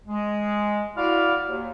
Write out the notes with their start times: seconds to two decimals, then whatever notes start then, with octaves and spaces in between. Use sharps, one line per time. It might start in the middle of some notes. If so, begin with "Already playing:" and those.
0.07 G#3
0.97 E4 F#4 D5 F5
1.46 D#2